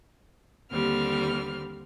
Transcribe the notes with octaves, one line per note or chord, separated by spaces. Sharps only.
D#2 D3 G3 C4 F6